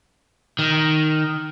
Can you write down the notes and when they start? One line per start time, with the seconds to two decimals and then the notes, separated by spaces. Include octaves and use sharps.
0.59 D#3